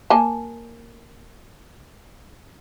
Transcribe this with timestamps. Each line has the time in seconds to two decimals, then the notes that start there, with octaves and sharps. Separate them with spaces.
0.10 A#3 G#5 A5